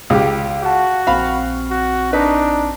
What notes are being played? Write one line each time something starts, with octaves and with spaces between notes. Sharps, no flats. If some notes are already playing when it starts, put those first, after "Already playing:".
C#2 G4
F#4 F5 F#5 A5
A#1 C4 F5 B5 F6
F#4
D4 D#4 B4